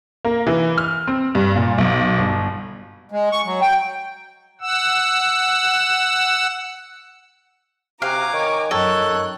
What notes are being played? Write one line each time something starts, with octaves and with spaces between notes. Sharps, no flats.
A#3
E3
F6
C4
G2
A#2
B1
G1
G#3
C#6
F#3
G5
F#5 E6
C3 F#4 F5 G#5 A#5 D6
D#3 C#5
F#2 D#3 A4 C#5 F#6